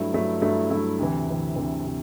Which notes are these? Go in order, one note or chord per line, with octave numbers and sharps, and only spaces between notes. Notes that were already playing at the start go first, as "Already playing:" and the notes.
Already playing: G2 F#3 A3 E4
G2 F#3 A3 E4
G2 F#3 A3 E4
G2 F#3 A3 E4
D2 C3 E3
D2 C3 E3
D2 C3 E3
C3